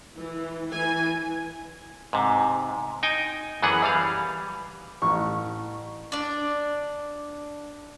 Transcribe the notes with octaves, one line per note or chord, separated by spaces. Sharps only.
E3
E3 G#5
G#2 C3
D#4 G5 G#5
F#2 E3 B3 G#4 F#5
E3 G3 F5
A1 C#6
D4 D5